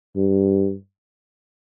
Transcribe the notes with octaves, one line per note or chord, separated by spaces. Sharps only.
G2